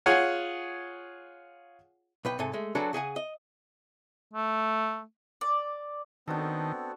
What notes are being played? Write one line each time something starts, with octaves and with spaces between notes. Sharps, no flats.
F4 G#4 C#5 F#5 G#5
B1 B4 G5
G#2 C3 A4 G#5
G#3 A3
F#3 D4 F#4 G#4 A4 B4
C#3 G#4 F#5 G#5
D#5
A3
D5
D#3 B3 C4 D4 F#4 A4